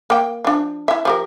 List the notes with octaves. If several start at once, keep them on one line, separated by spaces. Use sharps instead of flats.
A#3 G5
F3 D4
E4 E5
F3 G4 A#4